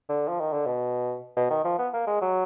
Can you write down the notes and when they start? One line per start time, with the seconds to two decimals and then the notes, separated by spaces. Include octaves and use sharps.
0.09 D3
0.28 F3
0.40 D#3
0.53 D3
0.66 B2
1.37 B2
1.50 D#3
1.64 F3
1.78 B3
1.93 A#3
2.07 G#3
2.22 F#3